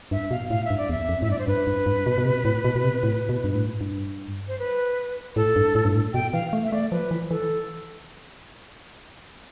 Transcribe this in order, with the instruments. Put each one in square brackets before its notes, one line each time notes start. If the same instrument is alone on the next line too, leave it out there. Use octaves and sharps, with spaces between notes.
[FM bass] G2 [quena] E5
[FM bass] B2 [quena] F5
[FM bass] A2 [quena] F5
[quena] E5
[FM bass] G2
[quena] D5
[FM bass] E2 [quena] E5
[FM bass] F2
[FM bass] A2 [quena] E5
[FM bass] G2 [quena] D5
[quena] C5
[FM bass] G2 [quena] B4
[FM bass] G2
G2
B2
B2
C3
A2
B2
B2
C3
A2
B2
G2
A2
G2
[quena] C5
B4
[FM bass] A2 [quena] A4
[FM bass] G2
A2
G2
A2
[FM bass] B2 [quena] G5
[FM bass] E3 [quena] F5
[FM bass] A3
[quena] E5
[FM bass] A3 [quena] D5
[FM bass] F3 [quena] B4
[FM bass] E3
[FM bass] E3 [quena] A4